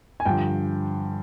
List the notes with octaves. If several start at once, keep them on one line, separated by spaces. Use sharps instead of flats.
G#5
G2 D3 F3 G5